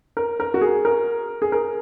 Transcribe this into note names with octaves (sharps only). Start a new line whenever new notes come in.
A#4
A#4
F#4
G#4
A#4
G#4
A#4